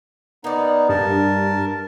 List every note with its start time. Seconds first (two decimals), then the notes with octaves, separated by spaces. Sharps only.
0.44 A#3 B3 D#4 D5
0.89 G2 A#4 A5